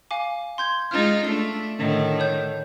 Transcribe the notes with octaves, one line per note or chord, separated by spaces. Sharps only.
F5 G#5 D6
C6 G6 G#6
G#3 D#4 F4 F6 A6
A3 D4 C7
A2 D3 D#3
C#5 G6